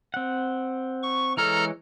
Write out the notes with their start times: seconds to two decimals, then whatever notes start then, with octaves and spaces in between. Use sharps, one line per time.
0.14 C4 F#5
1.03 C#6
1.37 E3 G#3 A4 C#5 A#5 F6